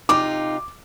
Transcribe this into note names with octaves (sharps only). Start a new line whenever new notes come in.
C3 D#4 F4 D6